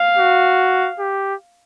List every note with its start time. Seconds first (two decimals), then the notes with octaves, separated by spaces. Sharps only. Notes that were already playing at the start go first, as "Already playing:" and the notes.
Already playing: F5
0.18 F#4
0.99 G4